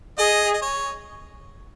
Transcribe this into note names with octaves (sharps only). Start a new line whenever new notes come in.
G#4 D#5
D#5
C#5